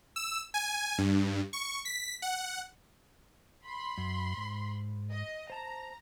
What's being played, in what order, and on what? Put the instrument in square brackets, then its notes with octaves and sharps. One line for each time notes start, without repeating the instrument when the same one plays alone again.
[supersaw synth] E6
G#5
G2
C#6
B6
F#5
[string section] B5 C6
[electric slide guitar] F#2
G#2
[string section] D#5
[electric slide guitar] C5 A5 [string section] A#5